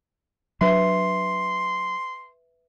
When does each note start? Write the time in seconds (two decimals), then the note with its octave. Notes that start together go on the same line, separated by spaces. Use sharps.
0.61 F#3 D4 B4 E5 C6